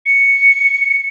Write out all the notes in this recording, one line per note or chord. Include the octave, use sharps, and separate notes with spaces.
C#7